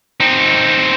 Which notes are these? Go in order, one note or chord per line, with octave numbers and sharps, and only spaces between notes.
C4 D#4